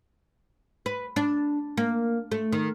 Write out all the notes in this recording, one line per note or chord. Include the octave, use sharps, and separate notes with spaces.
B4
D4
A#3
A3
D#3